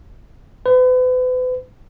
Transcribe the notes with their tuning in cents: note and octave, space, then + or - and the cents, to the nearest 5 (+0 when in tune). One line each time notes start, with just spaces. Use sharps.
B4 +40